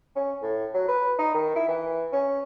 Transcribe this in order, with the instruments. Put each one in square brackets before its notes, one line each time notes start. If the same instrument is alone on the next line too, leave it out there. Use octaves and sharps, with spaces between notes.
[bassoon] C#4
A2
F#3
B4
D#4
D#3
E4
E3
C#4